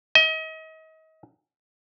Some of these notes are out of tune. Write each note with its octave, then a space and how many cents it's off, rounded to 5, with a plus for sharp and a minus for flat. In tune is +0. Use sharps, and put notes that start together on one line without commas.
D#5 +35